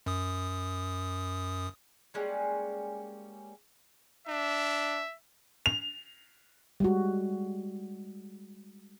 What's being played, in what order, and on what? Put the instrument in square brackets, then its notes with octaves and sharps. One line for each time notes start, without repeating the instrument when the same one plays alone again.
[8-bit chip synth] F#2 D#6
[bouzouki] G3 G#3 A#3 C#4
[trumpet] D4 [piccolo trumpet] E5
[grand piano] F7
[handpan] G3 G#3 F#4